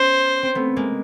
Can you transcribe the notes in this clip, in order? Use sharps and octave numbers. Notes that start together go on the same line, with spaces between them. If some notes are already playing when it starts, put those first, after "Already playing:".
Already playing: B3 C#4 C5
C4
A3 B3
G#3 A#3